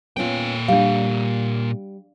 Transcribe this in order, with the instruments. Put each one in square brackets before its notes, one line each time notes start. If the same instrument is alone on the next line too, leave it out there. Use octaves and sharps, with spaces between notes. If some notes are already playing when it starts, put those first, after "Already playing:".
[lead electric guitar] A#2 G5 [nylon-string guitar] B3 C#4 F4
[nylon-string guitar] G3 [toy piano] D4 F5